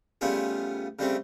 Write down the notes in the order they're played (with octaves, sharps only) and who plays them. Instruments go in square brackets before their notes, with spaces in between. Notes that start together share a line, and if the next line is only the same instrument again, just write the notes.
[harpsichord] C#3 G3 A3 B3 F4 G#4
C#3 G3 A3 C4